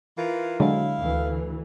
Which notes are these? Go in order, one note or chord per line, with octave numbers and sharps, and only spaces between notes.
E3 F4 A#4
D3 F#3 G#3 E4 F5
D2 E3